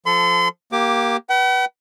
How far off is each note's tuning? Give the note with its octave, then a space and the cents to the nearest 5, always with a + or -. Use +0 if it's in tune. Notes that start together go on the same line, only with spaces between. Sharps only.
F3 +0 A4 +0 C6 -40
A#3 +10 G4 -10 D6 +10
B4 -15 F#5 +45